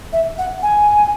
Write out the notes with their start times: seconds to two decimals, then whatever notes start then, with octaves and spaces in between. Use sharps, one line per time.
0.13 E5
0.38 F#5
0.63 G#5